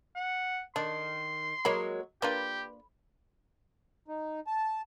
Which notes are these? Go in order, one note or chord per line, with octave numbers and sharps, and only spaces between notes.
F#5
D#3 D4 C6
F#3 G#3 A#3 A#4 C#5 B5
A#3 D4 F4 G4 B4
D#4
A5